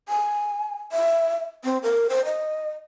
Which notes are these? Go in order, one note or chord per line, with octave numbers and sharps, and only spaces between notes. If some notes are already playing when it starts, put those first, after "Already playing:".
G#5
E5
C4
A#4
C5
D#5